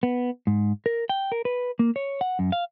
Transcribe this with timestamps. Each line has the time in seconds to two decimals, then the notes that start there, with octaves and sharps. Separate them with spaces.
0.03 B3
0.47 G#2
0.86 A#4
1.09 G5
1.32 A#4
1.45 B4
1.79 A#3
1.96 C#5
2.21 F#5
2.39 F#2
2.52 F5